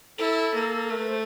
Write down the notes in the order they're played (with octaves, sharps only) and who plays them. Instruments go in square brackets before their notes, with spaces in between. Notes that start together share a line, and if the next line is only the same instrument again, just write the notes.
[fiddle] E4 [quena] A4
[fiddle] A#3
[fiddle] A3 [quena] A#4
[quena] B4
C5